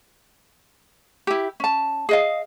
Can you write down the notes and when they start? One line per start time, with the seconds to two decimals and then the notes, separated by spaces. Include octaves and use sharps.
1.27 E4 G4
1.60 C#4 A5
2.09 G#4 D#5 F5